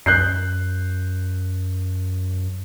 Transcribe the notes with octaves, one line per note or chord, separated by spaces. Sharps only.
F#2 F#6 G6 C7